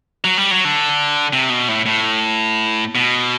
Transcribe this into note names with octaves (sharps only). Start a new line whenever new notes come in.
F#3
G3
F#3
D3
C3
B2
A2
A2
B2